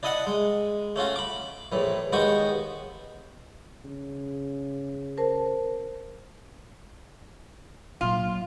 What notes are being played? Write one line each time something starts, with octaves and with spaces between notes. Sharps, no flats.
D4 E4 D#5 E5 F#5
G#3
A3 C#4 F4 F#4
B5 D6
A#1 A2 E3
D#2 G#3 B3 F#4 G4 C#6
C#3
A#4 C5 A5
A#2 F#3 F4